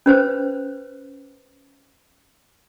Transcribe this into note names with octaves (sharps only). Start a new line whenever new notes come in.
C#4 B4 C5